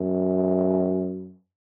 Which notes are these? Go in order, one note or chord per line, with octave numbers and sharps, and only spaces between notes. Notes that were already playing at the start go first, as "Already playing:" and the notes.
Already playing: F#2